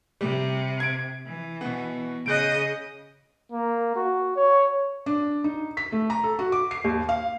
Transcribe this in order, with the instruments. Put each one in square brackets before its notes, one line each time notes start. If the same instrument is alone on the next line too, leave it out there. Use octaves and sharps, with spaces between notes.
[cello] C3 [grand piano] G3
[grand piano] G#6 D7
[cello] E3
[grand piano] B2 B3
[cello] C#3 D#5 [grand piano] F#6 G6 D7
[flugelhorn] A#3
F#4
C#5
[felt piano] D4
D#4
B6
A3
A#5
A4
F#4
D6
C7
D#2
F5